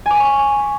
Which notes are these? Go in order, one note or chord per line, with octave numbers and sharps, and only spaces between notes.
G#5 C#6 D6 B6